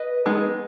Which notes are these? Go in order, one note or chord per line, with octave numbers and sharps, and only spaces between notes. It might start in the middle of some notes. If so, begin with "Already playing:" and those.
Already playing: B4 D#5
G#3 B3 D#4